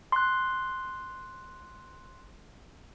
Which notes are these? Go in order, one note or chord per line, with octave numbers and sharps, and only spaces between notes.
C6 F#6